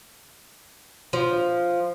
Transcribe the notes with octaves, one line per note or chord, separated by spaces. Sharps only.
F3